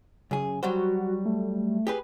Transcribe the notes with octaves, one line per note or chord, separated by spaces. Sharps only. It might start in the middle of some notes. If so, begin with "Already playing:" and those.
F#2 C#3 G#4
F#3 G3 F#4 C5
A3
G4 G#4 B4